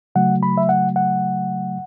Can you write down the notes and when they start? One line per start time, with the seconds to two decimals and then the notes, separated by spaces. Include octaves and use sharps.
0.15 C#3 F#3 A3 F#5
0.43 B5
0.57 E5
0.69 F#5
0.96 F#5